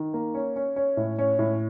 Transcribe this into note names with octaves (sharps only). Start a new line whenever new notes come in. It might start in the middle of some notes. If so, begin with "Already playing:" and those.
Already playing: D#3
A#3
C#4
C#4
C#4
A2
C#4
A2